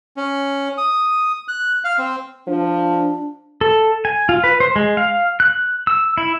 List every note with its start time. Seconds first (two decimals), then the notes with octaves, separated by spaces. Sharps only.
0.17 C#4
0.78 D#6
1.48 F#6
1.84 F5
1.98 C4
2.48 F3 D4
3.61 A4
4.05 G#5
4.29 F4
4.44 B4
4.60 C5
4.76 G#3
4.97 F5
5.40 F#6
5.87 E6
6.18 E4